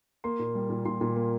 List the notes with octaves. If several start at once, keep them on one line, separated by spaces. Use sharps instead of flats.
A#3 C6
A#2
G3
A#2
A#2 C6
A#2
A#3